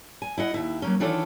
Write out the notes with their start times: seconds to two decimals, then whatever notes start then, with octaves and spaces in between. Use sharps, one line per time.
0.22 G#5
0.38 E4 D#5 F#5
0.54 D#2 E4
0.82 F#3 A#3 C#4
1.00 D#3 E3 D4 F4 A4 C#5